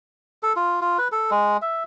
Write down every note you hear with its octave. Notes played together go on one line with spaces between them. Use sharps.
A4
F4
F4
B4
A4
G#3
E5